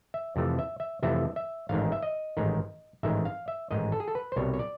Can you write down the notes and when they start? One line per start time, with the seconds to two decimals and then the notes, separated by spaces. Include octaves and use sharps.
0.14 E5
0.36 F2 C3 E3 A3
0.59 E5
0.80 E5
1.03 F2 C3 E3 A3 E5
1.36 E5
1.69 A1 G#2 D#3 F5
1.92 E5
2.03 D#5
2.37 A1 G#2 D#3
3.03 A1 G#2 D#3 E5
3.25 F5
3.48 E5
3.71 A1 G#2 D#3 D#5
3.92 A4
4.00 G#4
4.08 A4
4.15 B4
4.32 C5
4.36 C2 B2 G3 C#5
4.54 C#5
4.59 D5